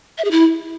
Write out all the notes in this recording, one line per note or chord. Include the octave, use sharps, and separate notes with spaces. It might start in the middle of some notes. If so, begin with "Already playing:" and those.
E5
G#4
E4